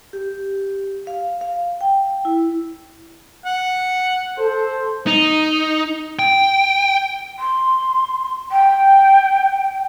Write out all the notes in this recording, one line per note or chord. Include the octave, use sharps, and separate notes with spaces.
G4
F5
F5
G5
E4
F#5
A4 C5
D#4
G5
C6
G5